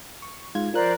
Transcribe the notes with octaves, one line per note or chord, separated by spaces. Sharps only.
C#6
G#2 F4 G#6
F3 A#4 C5 D5 F#6